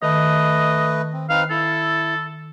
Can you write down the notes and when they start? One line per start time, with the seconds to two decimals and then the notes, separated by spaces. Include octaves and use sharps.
0.03 D#3 A3 B4 D#5
1.13 C4
1.30 C4 D#4 B4 F5
1.50 E4 A4